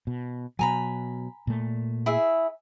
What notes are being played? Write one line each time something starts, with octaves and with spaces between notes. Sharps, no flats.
B2
B2 F#3 G#5 A#5 B5
A#2 A3
E4 G#4 E5